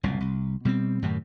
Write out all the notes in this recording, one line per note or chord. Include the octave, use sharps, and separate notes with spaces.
F#1 C2 A#2
C2
B2 G3 A3 C4
F#2 A2 C3 D#3